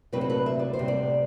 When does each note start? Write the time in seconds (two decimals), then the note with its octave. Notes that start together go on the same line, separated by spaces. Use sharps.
0.12 D2 C3 F#3 C4 B4
0.21 A4
0.30 B4
0.46 E5
0.59 D5
0.73 C5
0.79 D2 C3 G3
0.88 D5